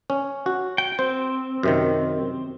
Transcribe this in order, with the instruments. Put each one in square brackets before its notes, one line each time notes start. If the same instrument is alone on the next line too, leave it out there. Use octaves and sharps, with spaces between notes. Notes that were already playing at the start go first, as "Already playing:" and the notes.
[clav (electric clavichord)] C#4
F#4
[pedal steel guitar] G5
[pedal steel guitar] C4 [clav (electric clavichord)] C5
[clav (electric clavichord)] F#2 C3 D#3